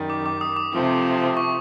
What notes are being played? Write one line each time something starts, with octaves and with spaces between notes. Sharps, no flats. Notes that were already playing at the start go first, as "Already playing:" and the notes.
Already playing: F#2 D#3 G3
D6
D6
D#6
D6
C3 F3 A3 C4
C#6